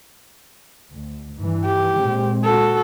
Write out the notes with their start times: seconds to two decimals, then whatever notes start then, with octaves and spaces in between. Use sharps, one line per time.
0.92 D2
1.34 G2 E3
1.65 G4
1.99 A#2 G#3 C4
2.44 F#4 A4